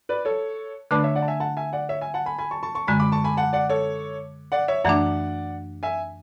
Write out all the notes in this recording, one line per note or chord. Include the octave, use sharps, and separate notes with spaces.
B4 D5
A4 C#5
D3 A3 D4 B4 D5
C#5 E5
D5 F#5
A5
E5 G#5
F#5 A5
E5 G#5
D5 F#5
C#5 E5
E5 G#5
F#5 A5
G#5 B5
G#5 B5
A5 C#6
A5 C#6
A5 C#6
F#2 D3 G#3 G#5 B5
B5 D6
A5 C#6
G#5 B5
F#5 A5
D5 F#5
A4 C#5
D5 F#5
C#5 E5
F#2 E3 A3 D4 D5 F#5
E5 G#5